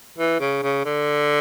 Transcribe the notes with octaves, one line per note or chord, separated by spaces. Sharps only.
E3
C#3
C#3
D3